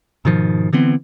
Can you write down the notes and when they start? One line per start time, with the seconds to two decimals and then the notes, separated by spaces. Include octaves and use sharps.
0.25 G#2 B2 D#3 F3
0.73 D3 E3 B3 C4